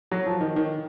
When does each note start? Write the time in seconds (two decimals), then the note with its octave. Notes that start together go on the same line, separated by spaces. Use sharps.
0.11 F#3
0.26 F3
0.41 D#3
0.56 D#3